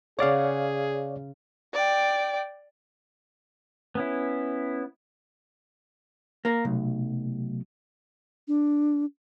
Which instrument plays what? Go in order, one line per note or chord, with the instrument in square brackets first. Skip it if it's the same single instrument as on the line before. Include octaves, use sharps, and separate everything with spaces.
[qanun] C#3 F#5 [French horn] G#4 [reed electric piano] C#5 D5 F5
[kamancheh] D5 G5
[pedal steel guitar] B3 C#4 E4
[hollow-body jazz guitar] A#3 A#4
[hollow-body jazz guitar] B1 [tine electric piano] C3 F#3 A3
[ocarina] D4